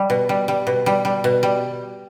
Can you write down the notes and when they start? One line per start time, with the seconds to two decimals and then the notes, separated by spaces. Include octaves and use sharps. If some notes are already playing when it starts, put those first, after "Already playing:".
Already playing: G3
0.10 B2
0.29 G3
0.48 G3
0.67 B2
0.86 G3
1.05 G3
1.24 B2
1.43 G3